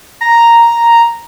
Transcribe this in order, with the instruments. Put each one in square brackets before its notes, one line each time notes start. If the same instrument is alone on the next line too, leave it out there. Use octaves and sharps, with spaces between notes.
[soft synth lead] A#5